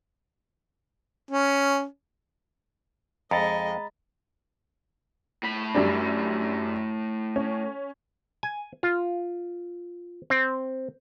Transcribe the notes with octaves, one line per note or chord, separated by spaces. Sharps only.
C#4
F2 G#3 D#5 A#5 B5 A6
A2 B5
F#2 G3 D4
C#4
G#5
F4
C4